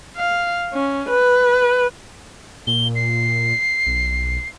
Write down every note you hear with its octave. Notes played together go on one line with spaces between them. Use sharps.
F5
C#4
B4
A#2 G7
C7
B1